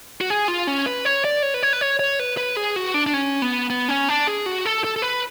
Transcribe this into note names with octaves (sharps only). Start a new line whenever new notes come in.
F#4
G#4
F4
C#4
B4
C#5
D5
C#5
B4
C#5
B4
C#5
C#5
B4
B4
G#4
F#4
D4
D4
C#4
B3
B3
C#4
D4
G#4
F#4
A4
A4
A4
B4